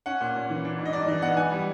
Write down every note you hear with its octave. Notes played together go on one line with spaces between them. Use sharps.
C#4 F#5
A#2
A#2
E3
D4
G#2
D#5
G2 D5
E3 D#5
B3 F#5
E3 G#5
G3